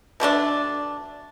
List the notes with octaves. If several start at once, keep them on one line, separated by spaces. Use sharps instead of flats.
B2 D3 A3 D4